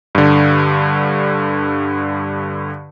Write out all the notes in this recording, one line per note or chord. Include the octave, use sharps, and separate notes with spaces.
G2 D3